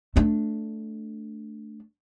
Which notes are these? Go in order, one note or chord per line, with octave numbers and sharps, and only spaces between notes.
A3 D4